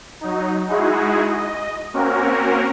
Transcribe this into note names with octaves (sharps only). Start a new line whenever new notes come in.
F#3 D#4
G#3 D#4 E4 F#4 G#4
D#5
A#3 C4 C#4 F#4 A#4